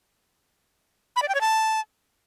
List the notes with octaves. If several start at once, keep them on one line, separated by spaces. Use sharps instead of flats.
B5
D5
G5
C#5
A5